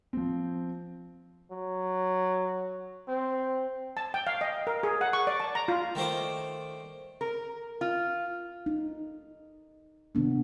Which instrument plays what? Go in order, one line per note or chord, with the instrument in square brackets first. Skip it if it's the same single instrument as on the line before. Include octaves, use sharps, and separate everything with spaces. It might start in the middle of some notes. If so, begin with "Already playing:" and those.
[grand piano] F3 C4
[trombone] F#3
C4
[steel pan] A5
G5
F5
D#5
A#4
G#4
F#5
C#6
D5
A5
A#5
F4
[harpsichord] D#3 A3 C5 D5
[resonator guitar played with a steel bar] A#4
F4
[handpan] D#4
C3 D#3 B3 D4